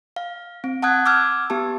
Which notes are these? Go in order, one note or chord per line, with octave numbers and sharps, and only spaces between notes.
F5
C4
F#5 A5 D#6 F#6 G#6
D6 E6 F6 G#6
B3 G4 A5